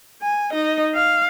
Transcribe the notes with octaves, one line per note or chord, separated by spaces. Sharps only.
G#5
D#4 D#5
F5